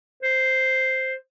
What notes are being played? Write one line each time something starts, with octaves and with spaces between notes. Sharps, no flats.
C5